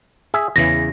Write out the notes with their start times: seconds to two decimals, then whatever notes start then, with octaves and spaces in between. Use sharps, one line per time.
0.34 G#4 E5
0.56 E2 C#3 E3 A#6